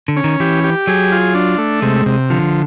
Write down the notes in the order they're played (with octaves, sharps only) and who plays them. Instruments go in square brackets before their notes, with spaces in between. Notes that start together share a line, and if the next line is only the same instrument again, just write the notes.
[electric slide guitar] D3
[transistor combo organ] C#4
[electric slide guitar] D#3
[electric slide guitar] E3 [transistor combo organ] G4
[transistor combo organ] G4
[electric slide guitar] F#3 [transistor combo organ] G#4
[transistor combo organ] F4
D4
A3
[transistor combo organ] C3 [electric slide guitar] G#3
[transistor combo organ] C3
[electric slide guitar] D3 [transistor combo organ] F3